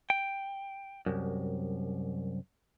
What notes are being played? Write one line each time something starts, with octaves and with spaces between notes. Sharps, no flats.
G5
C2 F#2